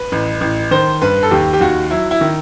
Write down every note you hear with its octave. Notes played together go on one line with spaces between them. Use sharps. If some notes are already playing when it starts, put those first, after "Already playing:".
Already playing: B4
A1
A1
D#3 C5
G2 B4
A4
D#2 G4
G4
D#2 F#4
F#3 E4
E4
D#3